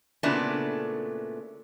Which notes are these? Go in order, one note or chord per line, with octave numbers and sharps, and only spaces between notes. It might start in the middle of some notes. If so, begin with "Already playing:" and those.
A#2 C#3 A3 B3 D4 E4